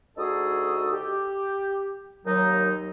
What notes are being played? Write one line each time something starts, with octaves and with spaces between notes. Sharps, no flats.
D2 D#4 F#4 G#4 A4 D#6
G4
D#2 F#3 D#4